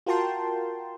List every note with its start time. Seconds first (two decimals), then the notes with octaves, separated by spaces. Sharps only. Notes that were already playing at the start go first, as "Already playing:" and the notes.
0.06 F4 F#4 A#4 G5 A5 C6